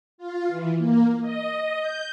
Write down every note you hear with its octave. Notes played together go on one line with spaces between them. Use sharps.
F4
E3
A#3
D#5
G6